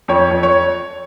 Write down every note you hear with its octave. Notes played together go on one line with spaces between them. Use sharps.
F2 C#5
F2
C#5